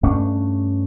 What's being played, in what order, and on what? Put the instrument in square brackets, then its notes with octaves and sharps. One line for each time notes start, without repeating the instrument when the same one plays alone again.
[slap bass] G2 A3 C#4 D4